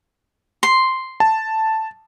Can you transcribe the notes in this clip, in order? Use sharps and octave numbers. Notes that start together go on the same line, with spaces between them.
C6
A5